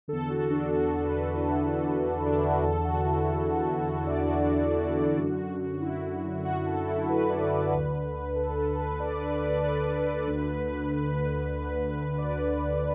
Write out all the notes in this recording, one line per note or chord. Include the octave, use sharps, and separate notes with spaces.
E2 D3 A4
F#4
D4
F#4
B4
E4
D4
E4
F#4
E2 D3 A4
F#4
E4
A4
D5
D4
F#4
F#2 D3
E4
F#4
F#4
A4
E4
B4
D5
B4
D2 D3
A4
A4
B4
D5
B4
D5
B4
D2 D3
D5